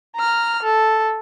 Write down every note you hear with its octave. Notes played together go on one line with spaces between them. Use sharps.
A#5 F6
A4